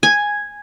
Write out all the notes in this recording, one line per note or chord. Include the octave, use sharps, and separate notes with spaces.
G#5